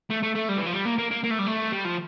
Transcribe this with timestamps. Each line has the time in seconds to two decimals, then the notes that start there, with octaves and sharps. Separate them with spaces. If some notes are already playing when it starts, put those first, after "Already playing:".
0.10 A3
0.22 A3
0.35 A3
0.49 G3
0.57 E3
0.66 F3
0.73 G3
0.85 A#3
0.98 A#3
1.11 A#3
1.24 A#3
1.30 A3
1.39 G3
1.47 A3
1.72 G3
1.85 F3